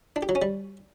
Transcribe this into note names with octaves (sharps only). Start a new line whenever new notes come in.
D4
G4
F#3
C#4
G3